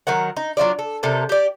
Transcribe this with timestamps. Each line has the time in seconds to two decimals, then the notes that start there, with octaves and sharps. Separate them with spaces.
0.07 D#3 F#3 A#4 F#5
0.37 D#4
0.57 F#3 D4 F4 D5
0.79 A4
1.03 C3 G3 A4 A#4
1.29 G4 D5